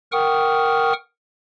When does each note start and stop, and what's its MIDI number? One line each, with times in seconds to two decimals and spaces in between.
0.12 0.93 70
0.12 0.93 78
0.12 0.93 79
0.12 0.93 85
0.12 0.93 87
0.12 0.93 89